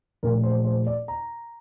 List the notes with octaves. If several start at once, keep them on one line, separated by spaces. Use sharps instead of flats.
A#1 A#2 A3 A#4
C5
C5
D5
A#5